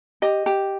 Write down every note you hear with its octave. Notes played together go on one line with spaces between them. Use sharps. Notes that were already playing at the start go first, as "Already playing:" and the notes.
G4 D#5
G4